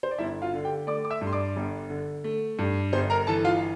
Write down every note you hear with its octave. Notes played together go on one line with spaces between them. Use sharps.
C5
D5
G1 E4 E5
F4 F5
D3
G4 G5
A3 D5 D6
D6
E5 E6
G2
C6
D5 D6
G1
D3
A3
G2
G1 C5 C6
A#4 A#5
E3 A4 A5
F4 F5